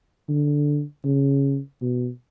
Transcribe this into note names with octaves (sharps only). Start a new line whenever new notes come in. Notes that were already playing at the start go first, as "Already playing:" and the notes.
D3
C#3
B2